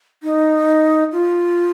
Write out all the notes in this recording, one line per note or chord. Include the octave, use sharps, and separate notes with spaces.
D#4
F4